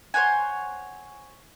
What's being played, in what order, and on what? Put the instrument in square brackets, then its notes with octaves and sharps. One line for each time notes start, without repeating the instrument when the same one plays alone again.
[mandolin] C5 C#5 F#5 G#5